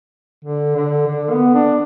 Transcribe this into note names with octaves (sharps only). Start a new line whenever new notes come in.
D3
D3
D3
B3
D4